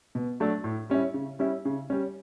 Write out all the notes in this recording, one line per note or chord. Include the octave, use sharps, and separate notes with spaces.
B2
F#3 A3 D4
A2
G3 C#4 E4
C#3
G3 C#4 E4
C#3
G3 C#4